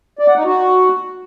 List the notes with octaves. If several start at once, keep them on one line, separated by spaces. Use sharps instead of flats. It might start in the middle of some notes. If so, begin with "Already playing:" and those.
D5
F#5
D#4
F#4